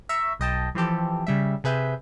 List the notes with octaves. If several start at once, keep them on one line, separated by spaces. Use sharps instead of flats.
E5 A#5 C#6 E6
B1 D#5 G5 A5
E3 F3 C4 G4 A4
C#3 G3 E5
C3 G#4 B4 E5 G6